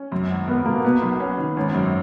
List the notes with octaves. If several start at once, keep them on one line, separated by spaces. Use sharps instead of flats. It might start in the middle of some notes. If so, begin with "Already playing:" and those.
Already playing: C#4
F#2
G#1
B3 A#4
B2 A#3
B2 B3
B1
C#4
D#3
G#1 C#4
F#2